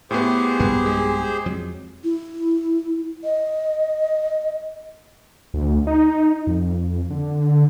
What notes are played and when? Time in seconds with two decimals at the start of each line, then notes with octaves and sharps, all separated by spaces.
0.11 A2 B3 G4 G#4 C5
0.60 B1 G2 A#3 B3
0.86 G#3
1.46 F2 F#3
2.04 E4
3.24 D#5
5.54 D2
5.87 D#4
6.47 F2
7.10 D3